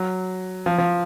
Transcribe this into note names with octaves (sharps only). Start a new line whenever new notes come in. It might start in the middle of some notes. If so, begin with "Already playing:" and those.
Already playing: F#3
F3
F3